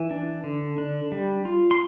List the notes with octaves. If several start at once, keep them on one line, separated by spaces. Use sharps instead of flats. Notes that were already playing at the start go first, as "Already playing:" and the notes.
Already playing: E3
D4
D3
D4
G3
F4
C6